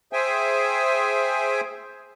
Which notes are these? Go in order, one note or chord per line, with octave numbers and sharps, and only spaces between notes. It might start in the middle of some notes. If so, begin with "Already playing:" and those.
G#4 C5 E5 G5 G#5